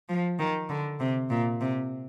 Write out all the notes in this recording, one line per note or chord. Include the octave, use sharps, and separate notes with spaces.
F3
D#3
D3
C3
A#2
C3